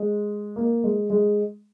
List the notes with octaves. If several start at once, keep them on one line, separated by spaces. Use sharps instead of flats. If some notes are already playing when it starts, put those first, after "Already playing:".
Already playing: G#3
A#3
G#3
G#3